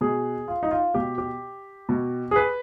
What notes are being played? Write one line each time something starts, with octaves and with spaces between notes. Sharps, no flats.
B2 G#4
F4
D#4
F4
B2 G4
G4
B2
G#4
B4